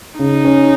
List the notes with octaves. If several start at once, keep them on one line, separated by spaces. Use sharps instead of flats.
C#3 D#4
C#4